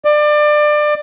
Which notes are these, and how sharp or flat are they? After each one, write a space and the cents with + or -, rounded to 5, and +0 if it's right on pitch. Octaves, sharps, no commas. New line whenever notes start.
D5 +25